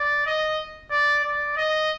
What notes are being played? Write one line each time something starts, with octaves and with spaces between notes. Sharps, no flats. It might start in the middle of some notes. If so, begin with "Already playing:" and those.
Already playing: D5
D#5
D5
D5
D#5